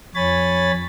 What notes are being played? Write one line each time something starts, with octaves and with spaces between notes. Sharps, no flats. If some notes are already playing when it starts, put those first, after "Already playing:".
F2 C#5 G#5 B5 A6